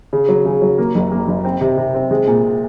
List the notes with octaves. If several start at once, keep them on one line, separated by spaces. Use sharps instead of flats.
C#3
F#3
C#3
F#3
A#3
F#1
A#3
F#1
C4
C3
C3
C4
G#3
A#2